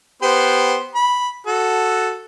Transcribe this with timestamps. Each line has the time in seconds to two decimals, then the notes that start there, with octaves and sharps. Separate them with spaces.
0.22 B3 G4 C5
0.95 B5
1.47 F#4 A4